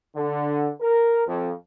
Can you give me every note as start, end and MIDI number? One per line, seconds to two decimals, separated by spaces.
0.15 0.69 50
0.81 1.27 70
1.27 1.51 41